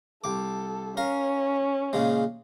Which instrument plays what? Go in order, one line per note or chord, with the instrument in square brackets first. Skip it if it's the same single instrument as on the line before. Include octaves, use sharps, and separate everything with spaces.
[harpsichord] C2 D6 [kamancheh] A4
[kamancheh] C#4 [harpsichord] A#4 F5
[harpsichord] A#2 C#3 G#3